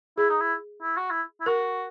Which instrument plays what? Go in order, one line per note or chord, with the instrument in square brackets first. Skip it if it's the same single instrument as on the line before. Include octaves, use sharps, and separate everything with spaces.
[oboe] E4 [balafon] G#4
[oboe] D#4
E4
E4
F#4
E4
E4
[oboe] F#4 [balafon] A#4